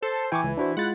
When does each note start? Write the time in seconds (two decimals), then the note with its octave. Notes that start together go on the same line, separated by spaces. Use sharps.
0.02 A4 C5
0.32 E3 G5 G#5 C#6 D6
0.44 C#2
0.57 D4 E4 F#4 C5
0.77 G#3 E4 F4 F#5 A6